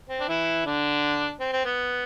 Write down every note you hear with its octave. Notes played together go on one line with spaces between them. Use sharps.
C4
D4
E3 E4
D3 D4
C4
C4
B3